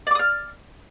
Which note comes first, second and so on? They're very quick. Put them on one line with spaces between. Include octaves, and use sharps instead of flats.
D5 D6 D#6 F6